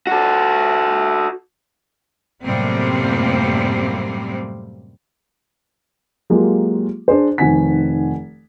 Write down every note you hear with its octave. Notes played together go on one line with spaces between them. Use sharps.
F#4 A4
F#2 A2 C3 G3 A#3 C4
F#3 G#3 A#3 F4 G4
D4 G#4 C5
F1 D#3 C4 F#5 G#5 B6